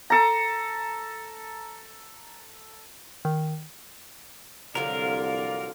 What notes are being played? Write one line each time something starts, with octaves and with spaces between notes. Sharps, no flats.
A4 A#5
D#3
C2 D3 F3 F#3 A#4 D5 F5